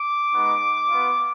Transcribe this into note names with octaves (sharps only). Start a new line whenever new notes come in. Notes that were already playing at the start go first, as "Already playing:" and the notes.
Already playing: D6
G#3 B3 D#4
B3 F4